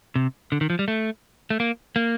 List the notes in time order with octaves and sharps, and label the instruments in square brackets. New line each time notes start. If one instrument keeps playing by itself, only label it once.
[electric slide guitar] C3
D3
D#3
F3
G3
A3
A3
A#3
A#3